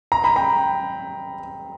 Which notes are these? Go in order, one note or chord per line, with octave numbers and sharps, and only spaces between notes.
A#5
B5
G5 A#5